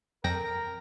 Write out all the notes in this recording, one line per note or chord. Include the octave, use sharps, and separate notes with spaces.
F2 A#4 G5 A#6